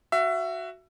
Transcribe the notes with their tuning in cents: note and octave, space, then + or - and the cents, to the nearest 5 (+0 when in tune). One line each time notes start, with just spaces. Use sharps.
F#4 +0 E5 +25